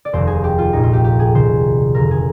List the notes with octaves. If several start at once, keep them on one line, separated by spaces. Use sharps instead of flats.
D5
F1 D#2 D#3 C5
G#4
G4
F4
A#1 A#2 D#4
F4
G4
G4
G#4
C2 C3 D#3 C5
F1 D#2 D3 A#4
G#4